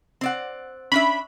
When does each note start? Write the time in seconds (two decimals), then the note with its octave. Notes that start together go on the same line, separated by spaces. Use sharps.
0.21 C4 D5 F#5
0.92 C#4 D4 E5 B5